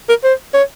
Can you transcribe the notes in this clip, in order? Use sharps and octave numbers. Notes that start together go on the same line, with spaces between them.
A#4
C5
C#5